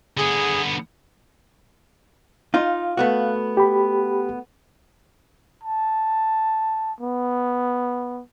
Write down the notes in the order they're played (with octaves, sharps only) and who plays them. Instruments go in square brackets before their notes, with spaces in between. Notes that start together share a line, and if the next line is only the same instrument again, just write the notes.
[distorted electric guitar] D3 B3 [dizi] G#4
[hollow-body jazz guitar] D#4 F4 [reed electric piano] F5
[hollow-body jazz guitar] A3 B3 F#4
[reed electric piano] G4 B5
[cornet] A5
B3